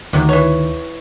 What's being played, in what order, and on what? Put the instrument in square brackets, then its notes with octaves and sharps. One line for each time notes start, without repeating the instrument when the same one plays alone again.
[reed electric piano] D2 D#3 [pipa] C3 F#3
[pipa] E3 C#5